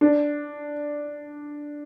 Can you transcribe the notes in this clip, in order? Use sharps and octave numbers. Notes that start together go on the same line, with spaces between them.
D4